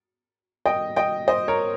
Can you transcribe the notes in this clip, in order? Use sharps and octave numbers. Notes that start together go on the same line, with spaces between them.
D#5 G5
D#5 G5
C5 D#5
A#4 C#5